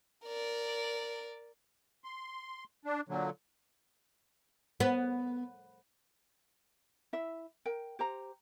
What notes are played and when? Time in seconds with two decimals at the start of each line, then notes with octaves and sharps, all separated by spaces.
0.24 A#4 D5
2.04 C6
2.85 D4
3.09 A#2 D3 F#3
4.80 B3
7.13 E4 E5
7.65 A#4 G5
7.99 G4 C5 A#5